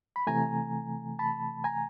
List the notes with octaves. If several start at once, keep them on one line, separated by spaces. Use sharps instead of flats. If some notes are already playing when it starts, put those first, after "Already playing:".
B5
C3 E3 A3 G#5 A#5
A5 B5
G#5 A#5